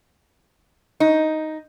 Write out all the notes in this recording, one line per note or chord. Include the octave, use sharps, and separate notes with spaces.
D#4